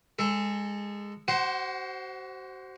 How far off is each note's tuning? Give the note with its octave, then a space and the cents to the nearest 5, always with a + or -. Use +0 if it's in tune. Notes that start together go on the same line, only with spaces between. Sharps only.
G#3 -20 A4 +10
F#4 +35 C5 +0 F#5 +0